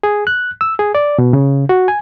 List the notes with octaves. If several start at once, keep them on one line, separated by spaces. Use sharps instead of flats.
G#4
F#6
E6
G#4
D5
B2
C#3
F#4
G#5